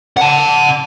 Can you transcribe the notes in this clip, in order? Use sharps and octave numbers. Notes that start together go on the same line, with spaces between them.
F#5 A5